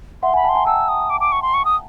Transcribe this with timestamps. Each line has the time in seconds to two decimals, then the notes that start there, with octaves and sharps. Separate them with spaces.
0.23 E5 F#5 C6
0.33 F#5 G#5 B5
0.44 G5 A5
0.49 C6
0.55 G#5 A#5
0.66 G5 A5 E6
0.88 D#6
1.10 D6
1.20 D6
1.32 C#6
1.42 C6
1.54 C#6
1.65 D#6